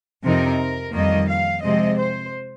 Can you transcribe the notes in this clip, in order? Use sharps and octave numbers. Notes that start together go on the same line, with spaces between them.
F2 C3 F3 C4 D#4 A#4
F2 D#3 G3 A#3 D#5
F5
C3 F3 G#3 C4 D#5
C5